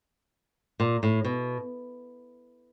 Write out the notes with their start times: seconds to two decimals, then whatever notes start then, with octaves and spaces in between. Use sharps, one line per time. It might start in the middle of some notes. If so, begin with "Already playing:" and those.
0.80 A#2
1.03 A2
1.24 B2